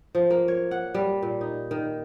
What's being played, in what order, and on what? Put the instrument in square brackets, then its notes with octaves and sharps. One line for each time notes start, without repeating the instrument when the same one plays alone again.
[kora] F3
A#3
C#5
F#5
G3
A#2
D#4
D#3